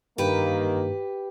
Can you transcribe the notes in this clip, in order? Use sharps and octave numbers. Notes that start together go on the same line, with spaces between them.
G2 D#3 E3 A#3 G4 B4